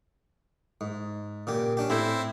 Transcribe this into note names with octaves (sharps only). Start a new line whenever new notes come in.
G#2
A#2 C#3 G4
C#4 D4 G4
A2 C4 E4 C5